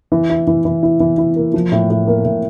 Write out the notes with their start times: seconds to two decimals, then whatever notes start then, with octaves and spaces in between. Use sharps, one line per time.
0.12 E3
0.30 E4
0.47 E3
0.65 E3
0.83 E4
1.00 E3
1.18 E4
1.36 A#3
1.54 F3
1.72 A2
1.90 A2
2.07 A#3
2.25 A2